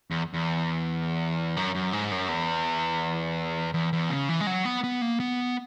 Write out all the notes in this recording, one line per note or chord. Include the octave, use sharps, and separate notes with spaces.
E2
E2
F#2
F#2
G#2
F#2
E2
E2
E2
C#3
E3
G#3
F#3
B3
B3
A#3
B3